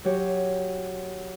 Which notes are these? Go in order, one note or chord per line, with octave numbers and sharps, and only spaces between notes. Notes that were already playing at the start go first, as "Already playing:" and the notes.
F#3 G4 C#5